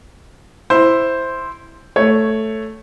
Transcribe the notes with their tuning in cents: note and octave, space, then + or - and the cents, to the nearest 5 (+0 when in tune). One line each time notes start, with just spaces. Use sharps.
E4 +0 C5 +0
A3 +0 C#5 +0